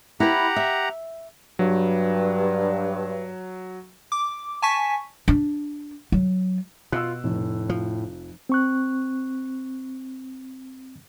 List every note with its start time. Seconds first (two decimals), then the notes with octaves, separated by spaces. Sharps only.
0.20 E4 G4 B4 F#5 A#5
0.56 E5
1.59 G2 F#3
4.12 D6
4.62 G#5 A5 C#6 B6
5.28 D4
6.12 F#3
6.92 B2 F4 E6 F#6
7.24 F1 A2
7.69 F3
8.49 C4 C#6 F#6